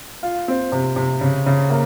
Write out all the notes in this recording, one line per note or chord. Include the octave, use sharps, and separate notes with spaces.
F4
C4
C3
C3
C#3
C#3
A#3